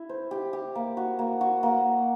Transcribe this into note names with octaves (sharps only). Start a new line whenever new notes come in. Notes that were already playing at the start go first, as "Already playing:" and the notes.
Already playing: E4
C5
G4
G4
A#3
F#4
A#3
F#4
A#3